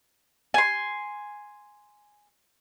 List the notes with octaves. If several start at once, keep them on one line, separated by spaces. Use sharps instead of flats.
G#5 C6